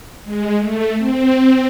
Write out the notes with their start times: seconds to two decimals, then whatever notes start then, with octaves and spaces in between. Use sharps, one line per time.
0.25 G#3
0.59 A3
0.98 C4